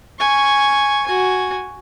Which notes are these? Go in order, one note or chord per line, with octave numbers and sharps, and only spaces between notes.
G#5 C#6
F#4 G#5